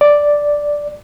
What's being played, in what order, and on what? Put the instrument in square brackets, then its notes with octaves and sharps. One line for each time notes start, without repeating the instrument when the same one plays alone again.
[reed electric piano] D5